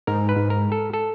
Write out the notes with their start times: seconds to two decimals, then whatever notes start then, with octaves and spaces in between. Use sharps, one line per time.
0.07 G#2 A#4
0.29 B4
0.36 G#2
0.50 A#4
0.72 A4
0.93 A4